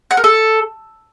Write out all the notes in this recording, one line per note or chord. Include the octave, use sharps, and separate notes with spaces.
F#5
A#4
A4